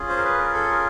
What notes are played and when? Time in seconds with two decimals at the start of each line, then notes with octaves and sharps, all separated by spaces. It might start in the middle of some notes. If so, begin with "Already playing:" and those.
Already playing: C#4 F4 G#4
0.09 C5
0.17 A#4
0.24 B4
0.39 A#4
0.54 A4
0.68 A#4